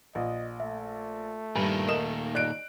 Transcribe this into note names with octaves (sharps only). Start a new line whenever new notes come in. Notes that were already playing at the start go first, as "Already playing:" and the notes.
A#1 D#5
A3 E5
G2 A#2 D#3 G#5 B5
A#4 D#5 D#6 E7
D5 D#5 F#6 D7